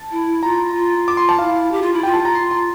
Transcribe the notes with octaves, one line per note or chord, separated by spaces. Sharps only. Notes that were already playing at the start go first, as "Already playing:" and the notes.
Already playing: A5
E4
F4 A#5
F4
D6
C6
A5
E4 F5
G4
F4
E4
F4 G5
A5
A#5
C6
C6